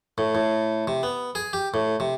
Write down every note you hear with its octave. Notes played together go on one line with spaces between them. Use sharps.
A2
A2
C3
B3
G#4
G4
A2
C3